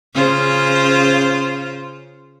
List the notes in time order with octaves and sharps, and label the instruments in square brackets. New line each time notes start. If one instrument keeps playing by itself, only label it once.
[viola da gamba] C#3 F4 C5